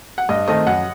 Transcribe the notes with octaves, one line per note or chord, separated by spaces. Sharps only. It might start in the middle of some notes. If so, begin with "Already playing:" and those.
F#5
G2 D#5
D#3 A3 C4 D#5
F#2 F#5